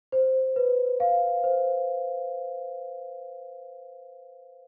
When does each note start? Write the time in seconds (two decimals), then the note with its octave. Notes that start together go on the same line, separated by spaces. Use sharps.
0.12 C5
0.56 B4
1.00 F5
1.44 C5